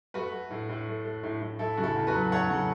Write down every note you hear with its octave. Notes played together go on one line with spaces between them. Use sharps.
A3 F#4 B4
A3
A2
A2
A3
A3
A2
A2
A3 E4 A4
C#3 F#4
E4 A4
E2
F#4 B4
F#3
A3 C#5 F#5
C#3